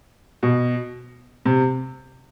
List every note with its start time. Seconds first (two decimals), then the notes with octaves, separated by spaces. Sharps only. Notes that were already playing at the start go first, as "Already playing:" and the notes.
0.43 B2
1.45 C3